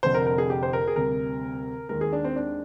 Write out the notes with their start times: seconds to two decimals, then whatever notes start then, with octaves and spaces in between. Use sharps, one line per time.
0.03 F1 F2 D3 C5
0.14 A#4
0.26 A#4
0.38 G#4
0.50 G4
0.63 C5
0.73 A#4
0.88 G#4
0.96 D2 C3 G3 A#4
1.89 D#2 D#3 G#3 A#4
2.01 G#4
2.13 D4
2.24 C4
2.36 D4